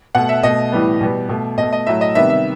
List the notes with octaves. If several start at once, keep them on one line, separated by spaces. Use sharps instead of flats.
B2 A3 F#5
E5
B2 A3 D#5
A2 E3 G3 B3
B2 G3 B3
B2 A3
B2 D#5
A3
D#5
A2 F#3 A3 E5
D#5
C3 D#3 G3 B3 E5
E5